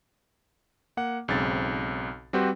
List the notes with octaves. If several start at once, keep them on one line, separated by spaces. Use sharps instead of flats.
A#3 F#5
B1 G#2 C#3 C4 A6
G3 C4 F#4 G4 B4 C5